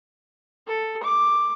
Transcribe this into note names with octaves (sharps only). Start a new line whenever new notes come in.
A4
D6